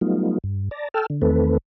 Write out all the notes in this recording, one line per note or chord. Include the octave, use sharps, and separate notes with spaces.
F#3 G3 A3 B3 D#4 F4
G2
D5 A5 A#5
A4 G5 A5 E6 F6
D3
E2 D#3 A3 C4 A4 B4